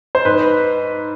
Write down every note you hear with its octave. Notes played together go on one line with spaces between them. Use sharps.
C5
G#2 B4